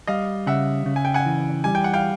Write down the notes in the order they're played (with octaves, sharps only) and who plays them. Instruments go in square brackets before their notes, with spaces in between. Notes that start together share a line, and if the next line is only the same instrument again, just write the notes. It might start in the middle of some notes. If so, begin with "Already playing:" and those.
[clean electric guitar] G3 [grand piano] D#5 F5
[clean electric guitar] C#3 [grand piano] E5 F#5
[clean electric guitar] C#3
[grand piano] G#5
G5
F#5 G#5
[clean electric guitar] E3
[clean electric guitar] G3 [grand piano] G#5
[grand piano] G5
F#5
F5 G5